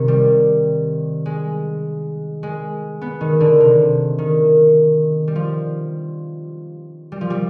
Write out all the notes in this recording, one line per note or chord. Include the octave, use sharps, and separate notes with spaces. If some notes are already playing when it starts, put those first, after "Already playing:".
Already playing: C3 D#3
G3
G#3
G#3
B3
D#3
D3
C3
D#3
G3
F3
G3
F3
G3